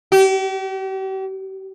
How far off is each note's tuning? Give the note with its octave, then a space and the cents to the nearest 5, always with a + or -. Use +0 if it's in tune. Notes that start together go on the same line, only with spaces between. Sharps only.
G4 -40